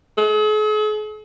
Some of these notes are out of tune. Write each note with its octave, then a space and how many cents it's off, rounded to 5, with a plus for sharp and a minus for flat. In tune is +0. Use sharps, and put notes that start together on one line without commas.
G#4 +45